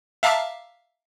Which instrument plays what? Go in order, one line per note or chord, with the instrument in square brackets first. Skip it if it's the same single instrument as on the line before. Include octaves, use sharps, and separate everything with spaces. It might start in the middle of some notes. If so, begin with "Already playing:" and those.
[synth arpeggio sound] E5 F5 A5 A#5 D6 F6